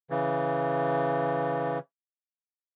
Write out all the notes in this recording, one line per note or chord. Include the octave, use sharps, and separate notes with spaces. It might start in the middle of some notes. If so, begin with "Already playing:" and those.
C#3 E3